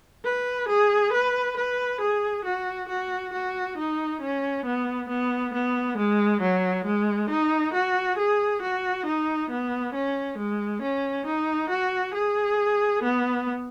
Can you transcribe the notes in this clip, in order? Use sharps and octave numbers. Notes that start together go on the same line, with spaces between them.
B4
G#4
B4
B4
G#4
F#4
F#4
F#4
D#4
C#4
B3
B3
B3
G#3
F#3
G#3
D#4
F#4
G#4
F#4
D#4
B3
C#4
G#3
C#4
D#4
F#4
G#4
B3